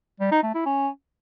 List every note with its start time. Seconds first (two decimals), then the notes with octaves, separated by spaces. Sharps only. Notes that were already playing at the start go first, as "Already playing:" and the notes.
0.20 G3
0.32 D#4
0.43 A3
0.55 E4
0.66 C#4